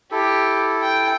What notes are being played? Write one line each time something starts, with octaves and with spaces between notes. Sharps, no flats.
E4 G4 A4
G5